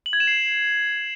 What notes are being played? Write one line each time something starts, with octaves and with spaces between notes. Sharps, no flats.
F#7
G#6
E7
C7